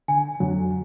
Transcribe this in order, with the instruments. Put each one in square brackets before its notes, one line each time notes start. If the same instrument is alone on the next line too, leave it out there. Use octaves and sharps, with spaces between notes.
[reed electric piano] D3 [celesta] G#5
[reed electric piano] F2 D3 F#3